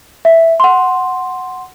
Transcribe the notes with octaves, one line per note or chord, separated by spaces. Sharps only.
E5
F#5 C6